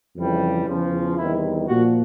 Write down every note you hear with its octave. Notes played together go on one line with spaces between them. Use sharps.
F2 C#3 E3 G3
E2 C#3 F3
E2 C3 D#3 G3 E4
A#2 F3 F#4